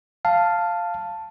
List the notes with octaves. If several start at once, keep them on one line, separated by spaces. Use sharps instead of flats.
F5 A5